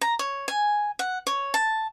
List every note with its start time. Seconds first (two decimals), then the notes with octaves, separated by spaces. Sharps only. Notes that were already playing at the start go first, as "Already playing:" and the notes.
0.01 A#5
0.19 C#5
0.48 G#5
0.99 F#5
1.27 C#5
1.54 A5